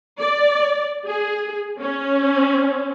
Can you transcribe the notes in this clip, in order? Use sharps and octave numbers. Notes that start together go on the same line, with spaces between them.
D5
G#4
C#4